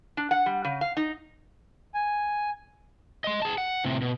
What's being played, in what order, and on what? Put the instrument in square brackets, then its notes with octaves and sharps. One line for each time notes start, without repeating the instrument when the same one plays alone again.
[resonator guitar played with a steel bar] D4
F#5
G3
C#3
F5
D#4
[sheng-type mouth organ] G#5
[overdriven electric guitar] D#5 C6
G#4 A5
F#5
A2 C3
B2